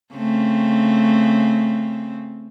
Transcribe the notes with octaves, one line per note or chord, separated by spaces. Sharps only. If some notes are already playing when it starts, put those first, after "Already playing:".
C#3 A3 C4